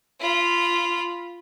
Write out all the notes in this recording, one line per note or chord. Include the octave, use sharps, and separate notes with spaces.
F4 B5